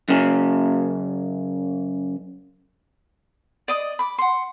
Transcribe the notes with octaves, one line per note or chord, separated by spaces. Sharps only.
F#2 C#3
D5 D#5 D#6
B5 D6
F#5 C6